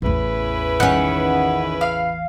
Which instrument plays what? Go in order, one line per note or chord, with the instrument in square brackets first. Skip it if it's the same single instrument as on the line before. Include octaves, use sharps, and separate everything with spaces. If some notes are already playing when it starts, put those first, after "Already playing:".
[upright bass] A1 E2 [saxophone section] C#3 E4 B4
[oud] D#3 C#4 [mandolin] F#5
[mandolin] F5